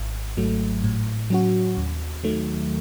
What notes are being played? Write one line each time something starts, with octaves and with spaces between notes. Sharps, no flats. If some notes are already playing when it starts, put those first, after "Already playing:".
Already playing: G#1
G#2 F#3 A3
A2
F#3 C#4 F#4
D#2
D#3 F#3 A3